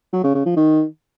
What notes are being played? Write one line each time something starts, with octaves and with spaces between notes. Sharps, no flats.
F#3
C#3
C#3
F3
D#3